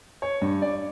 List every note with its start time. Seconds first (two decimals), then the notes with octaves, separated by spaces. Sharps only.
0.22 C#5
0.42 G2
0.62 D5